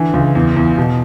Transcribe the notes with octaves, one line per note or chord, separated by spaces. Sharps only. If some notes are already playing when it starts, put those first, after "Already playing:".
Already playing: D3 E3
C#2
E2
E2
B2